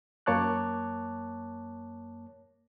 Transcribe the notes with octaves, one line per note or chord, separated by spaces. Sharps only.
F#2 A#3 C#5 A5 D6 F#6